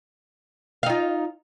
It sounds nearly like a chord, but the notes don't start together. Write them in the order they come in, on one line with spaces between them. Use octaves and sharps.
F5 D#4 F4